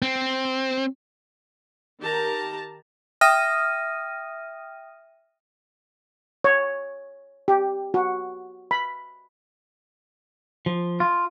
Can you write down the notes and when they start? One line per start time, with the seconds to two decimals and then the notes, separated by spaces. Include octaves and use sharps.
0.02 C4
2.01 D#3 G4 A#4 A5 A#5
3.21 E5 G5 D#6 F6 A#6 D#7
6.44 C#5
7.48 G4
7.94 F#4
8.71 B5
10.66 F3
11.00 F4